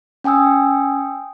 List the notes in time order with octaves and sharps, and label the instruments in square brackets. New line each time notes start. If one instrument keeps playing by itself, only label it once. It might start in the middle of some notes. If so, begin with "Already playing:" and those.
[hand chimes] C#4 G5 G#5 D#6 E6